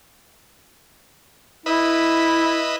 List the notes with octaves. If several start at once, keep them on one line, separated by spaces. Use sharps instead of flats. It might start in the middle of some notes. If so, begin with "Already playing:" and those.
E4 B4 D#5 E5